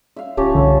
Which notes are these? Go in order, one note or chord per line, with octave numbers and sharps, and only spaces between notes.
E5 F5
D1 C#4 F4 G4 A5
C2 D3